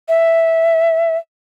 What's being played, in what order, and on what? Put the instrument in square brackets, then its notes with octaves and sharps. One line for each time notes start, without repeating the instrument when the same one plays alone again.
[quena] E5